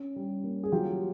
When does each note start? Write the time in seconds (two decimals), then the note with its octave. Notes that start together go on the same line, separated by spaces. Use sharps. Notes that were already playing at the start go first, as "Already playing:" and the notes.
Already playing: C#4
0.16 G3
0.44 A#3
0.64 G#4
0.72 F#3 F4 G4